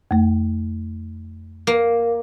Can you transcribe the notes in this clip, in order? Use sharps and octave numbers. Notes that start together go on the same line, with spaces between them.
F2 A3
A#3